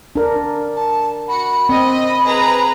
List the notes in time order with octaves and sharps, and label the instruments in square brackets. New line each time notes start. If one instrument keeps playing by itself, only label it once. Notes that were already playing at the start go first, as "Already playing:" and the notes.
[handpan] D4 A#4
[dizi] A5
[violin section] F#4 C#7 [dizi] B5
[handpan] C4 [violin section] D#5
[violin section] G#4 B4 A#5